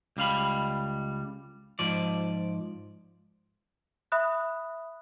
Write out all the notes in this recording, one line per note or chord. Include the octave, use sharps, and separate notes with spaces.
C#2 G3 F5 B5
G#2 F3 D5
E5 B5 D#6 F#6